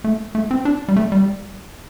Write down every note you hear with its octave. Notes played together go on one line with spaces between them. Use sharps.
A3
A3
C4
D4
G3
A3
G3